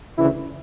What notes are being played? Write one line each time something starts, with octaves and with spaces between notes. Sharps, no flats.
D2 C#3 E3 E4